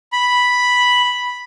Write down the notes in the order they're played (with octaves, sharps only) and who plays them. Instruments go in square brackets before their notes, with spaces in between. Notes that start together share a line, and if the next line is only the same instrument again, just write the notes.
[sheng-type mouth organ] B5